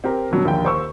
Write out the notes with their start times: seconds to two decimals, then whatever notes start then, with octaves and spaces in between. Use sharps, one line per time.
0.04 C4 G4 A#4
0.31 B2 F#3 G3 D4
0.45 A#1 D#2 D3 G5
0.65 C5 C#6 E6